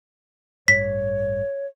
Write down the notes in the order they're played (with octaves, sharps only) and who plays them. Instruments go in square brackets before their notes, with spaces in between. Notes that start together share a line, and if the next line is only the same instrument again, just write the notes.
[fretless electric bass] A1 G2 [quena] C#5 [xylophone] B6